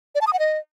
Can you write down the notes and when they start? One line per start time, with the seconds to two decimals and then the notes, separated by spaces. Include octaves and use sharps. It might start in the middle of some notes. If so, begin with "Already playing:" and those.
0.15 D5
0.21 A5
0.27 D#6
0.33 F#5
0.39 D#5